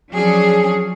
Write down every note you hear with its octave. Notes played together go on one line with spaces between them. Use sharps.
F3 F#3 C#4 D4 G#4